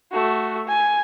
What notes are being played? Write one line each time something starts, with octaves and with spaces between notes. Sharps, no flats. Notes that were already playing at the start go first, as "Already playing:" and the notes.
A3 F#4
G#5